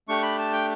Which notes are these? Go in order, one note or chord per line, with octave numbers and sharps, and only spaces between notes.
A3 D4 G4 C#6
B5
A5
G5